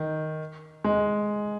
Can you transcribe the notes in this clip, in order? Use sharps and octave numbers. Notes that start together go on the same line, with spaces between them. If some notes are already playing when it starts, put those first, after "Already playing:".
Already playing: D#3
G#3